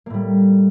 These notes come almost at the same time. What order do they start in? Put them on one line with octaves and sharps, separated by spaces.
A#3 A2 G3